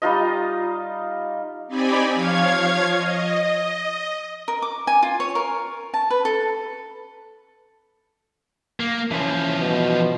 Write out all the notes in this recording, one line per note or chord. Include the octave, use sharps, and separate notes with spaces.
G3 D#4 F4 D#5
C4 D#4 G4 D5 G#5 B5
F3 C#5 F5 G#6
D#5
A#4
D6
G#5
F4
C#5
A#4
A5
B4
A4
A#3
E3 F3 C#4
B2